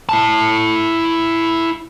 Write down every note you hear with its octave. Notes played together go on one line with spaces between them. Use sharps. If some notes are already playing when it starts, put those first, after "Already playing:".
E4 A5